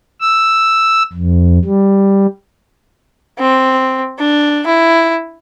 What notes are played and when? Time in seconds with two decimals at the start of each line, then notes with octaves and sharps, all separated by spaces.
0.21 E6
1.13 F2
1.65 G3
3.39 C4
4.18 D4
4.66 E4